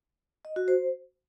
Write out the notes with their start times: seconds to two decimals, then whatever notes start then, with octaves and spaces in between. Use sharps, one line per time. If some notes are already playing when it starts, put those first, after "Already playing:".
0.45 D#5
0.56 F#4
0.68 C5